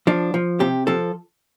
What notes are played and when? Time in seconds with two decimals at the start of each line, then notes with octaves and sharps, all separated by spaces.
0.07 F3 D4
0.34 F3
0.60 C3 G4
0.87 F3 A4